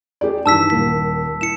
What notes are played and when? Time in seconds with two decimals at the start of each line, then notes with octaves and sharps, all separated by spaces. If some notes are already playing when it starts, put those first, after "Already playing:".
0.21 G4 G#4 D5
0.46 G2 D#3 E3 A5 E6 B6
0.70 D#1 G3 A#3 B6
1.41 E4 C#7 E7